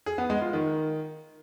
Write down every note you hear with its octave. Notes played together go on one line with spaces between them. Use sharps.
G#4
B3
G#3
F4
D#3